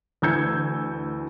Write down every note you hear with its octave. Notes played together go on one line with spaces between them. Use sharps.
D2 E3 E6 G6 G#6 C#7